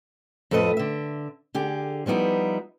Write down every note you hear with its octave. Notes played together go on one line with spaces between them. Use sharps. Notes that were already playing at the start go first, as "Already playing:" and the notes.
F2 A2 A4 B4 D#5
D3 E5
D3 G4 G#4
F3 G3 B3 D#4 E4